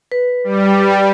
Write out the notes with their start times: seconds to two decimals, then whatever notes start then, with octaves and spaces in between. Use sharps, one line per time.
0.12 B4
0.44 G3